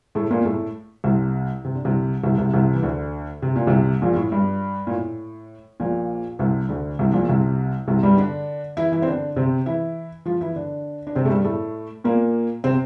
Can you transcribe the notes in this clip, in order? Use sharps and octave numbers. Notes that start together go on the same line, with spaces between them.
A2 A3
A#2 A#3
A2 A3
C2 C3
C3
D3
C2 C3
C2 C3
C2 C3
C2 C3
E3
D2 D3
C3
A#2
C2 C3
A#1 A#2
A2
G2
A#2
A2
A#1 A#2
C2 C3
D2 D3
C2 C3
A#1 A#2
C2 C3
C2 C3
G2 G3
D3 D4
E3 E4
E3 E4
C4
D3 D4
C3 C4
E3 E4
F3 F4
E3 E4
D3 D4
D4
C3 C4
A3
G2 G3
A2 A3
A#2 A#3
C3 C4